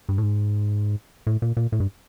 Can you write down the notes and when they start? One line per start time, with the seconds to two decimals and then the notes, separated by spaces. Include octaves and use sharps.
0.09 G2
0.18 A2
0.23 G#2
1.27 A2
1.42 A#2
1.57 A#2
1.72 A2
1.80 G2